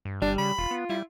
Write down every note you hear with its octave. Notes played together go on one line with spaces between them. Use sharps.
G2
G1 G3 D4
C#3 B5
E1 F4
B3
G3 E4